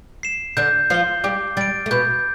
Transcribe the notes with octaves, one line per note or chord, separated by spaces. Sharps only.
C7 E7
D3 D4 G6
F3 F4 C7 G7
G3 G4 D6
G3 G4 A6 D7
A3
B2 B3 G6